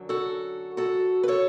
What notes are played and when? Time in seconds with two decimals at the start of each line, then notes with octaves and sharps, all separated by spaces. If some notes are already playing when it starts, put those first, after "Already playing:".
Already playing: F#2 D3 F#3
0.09 F#4 A4
0.77 F#4 A4
1.23 B4
1.28 A4 C#5